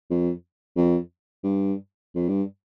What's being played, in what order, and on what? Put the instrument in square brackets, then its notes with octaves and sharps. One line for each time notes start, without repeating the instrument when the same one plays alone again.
[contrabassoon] F2
F2
G2
F2
G2